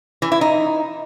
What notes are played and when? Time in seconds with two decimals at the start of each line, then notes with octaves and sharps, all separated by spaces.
0.22 E3
0.32 E4
0.41 D#4